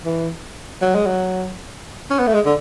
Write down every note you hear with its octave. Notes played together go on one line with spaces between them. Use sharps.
E3
F#3
G#3
F#3
C#4
B3
A3
G#3
D3